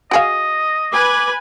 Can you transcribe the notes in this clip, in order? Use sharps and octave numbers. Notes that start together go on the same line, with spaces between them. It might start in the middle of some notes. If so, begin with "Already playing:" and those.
F#4 G#4 D#5 F5
B4 G#5 D6